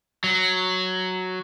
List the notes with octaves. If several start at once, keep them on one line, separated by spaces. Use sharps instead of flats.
F#3